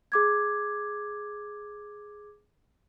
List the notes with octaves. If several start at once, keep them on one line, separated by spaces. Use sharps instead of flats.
G#4 D6 G#6